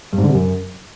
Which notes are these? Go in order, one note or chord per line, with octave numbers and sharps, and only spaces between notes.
G2
G#2
D3
C3
F#2